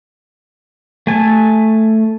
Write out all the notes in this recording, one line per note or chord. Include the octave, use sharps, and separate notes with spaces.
A3 G#5 A5